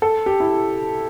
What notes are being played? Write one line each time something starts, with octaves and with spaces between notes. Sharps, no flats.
A4
G4
E4